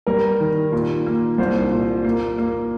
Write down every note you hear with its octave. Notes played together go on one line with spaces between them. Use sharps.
G3 A#4
D#3
A#2
A#3
C2 C5
A#2
A#3
A#3